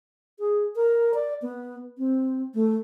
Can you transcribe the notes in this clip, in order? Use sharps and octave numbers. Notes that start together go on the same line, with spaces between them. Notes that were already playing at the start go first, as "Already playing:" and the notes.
G#4
A#4
D5
B3
C4
A3